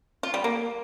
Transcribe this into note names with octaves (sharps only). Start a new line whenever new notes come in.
F4
G3
A#3